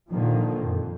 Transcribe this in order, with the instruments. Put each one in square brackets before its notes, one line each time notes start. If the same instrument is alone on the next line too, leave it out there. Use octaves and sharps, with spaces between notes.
[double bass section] A#2 D3 D#3 F3 A#3
F2